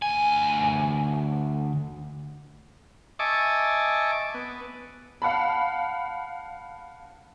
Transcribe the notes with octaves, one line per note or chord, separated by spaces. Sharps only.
D2 G#5
D#5 E5 G#5 A5 C#6 D6
B3
F5 F#5 A5 B5